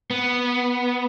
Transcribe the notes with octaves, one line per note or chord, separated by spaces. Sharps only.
B3